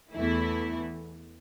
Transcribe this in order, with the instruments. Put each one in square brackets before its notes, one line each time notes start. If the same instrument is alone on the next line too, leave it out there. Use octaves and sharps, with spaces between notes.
[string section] E2 E3 A3 E4